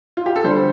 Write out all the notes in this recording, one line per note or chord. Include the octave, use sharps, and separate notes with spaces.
F4
G4
A4
D3 G3 D4 C5